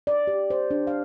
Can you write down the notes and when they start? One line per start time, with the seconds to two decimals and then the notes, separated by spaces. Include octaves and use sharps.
0.07 D5
0.27 G4
0.50 C5
0.71 D4
0.87 F5